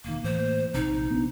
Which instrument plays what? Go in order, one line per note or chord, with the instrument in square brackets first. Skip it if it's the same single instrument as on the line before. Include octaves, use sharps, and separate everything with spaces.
[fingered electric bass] E1 D#3 [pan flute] A#3
[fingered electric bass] A2 E3 A#3 [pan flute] C5
[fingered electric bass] A#1 C3 [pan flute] D#4
[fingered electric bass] B3 C4 D4